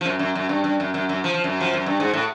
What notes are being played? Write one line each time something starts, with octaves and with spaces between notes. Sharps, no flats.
F3
F#2
F#2
F#2
G2
G2
F#2
F#2
F#2
F3
F3
F#2
F3
F#2
G2
G#2
A2